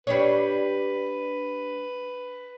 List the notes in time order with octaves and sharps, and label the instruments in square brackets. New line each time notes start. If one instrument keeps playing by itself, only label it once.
[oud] G3 D4 C#5 [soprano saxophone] B4